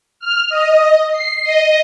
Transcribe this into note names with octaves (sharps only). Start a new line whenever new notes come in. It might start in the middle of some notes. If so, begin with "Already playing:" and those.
F6
D#5
C7
D#5